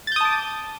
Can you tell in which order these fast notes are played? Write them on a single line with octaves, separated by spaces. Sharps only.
A6 G6 D#6 A5 D6